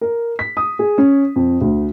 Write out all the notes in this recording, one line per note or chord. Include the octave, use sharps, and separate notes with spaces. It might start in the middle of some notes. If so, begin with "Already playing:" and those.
A#4
B6
D#6
G#4
C#4
F2
D2